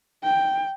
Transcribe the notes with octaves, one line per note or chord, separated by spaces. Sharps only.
G5